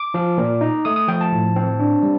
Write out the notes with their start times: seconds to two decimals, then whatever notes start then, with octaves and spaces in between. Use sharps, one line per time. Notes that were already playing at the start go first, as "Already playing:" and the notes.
Already playing: D6
0.14 F3
0.38 A#2
0.61 D#4
0.85 A3 D#6
0.96 D#6
1.08 F3 G5
1.21 A5
1.32 A2
1.56 C4
1.80 D4
2.03 G3